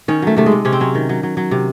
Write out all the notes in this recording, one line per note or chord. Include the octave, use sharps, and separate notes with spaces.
D#3 C#4
F#3 A3
C3 A3
G#3
C3
C3 C#4
C4
F#3 C#4
D#3
F#3
F#3
F#3
C3